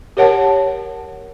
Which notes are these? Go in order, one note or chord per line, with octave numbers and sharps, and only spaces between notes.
G4 A#4 C#5 F#5 A5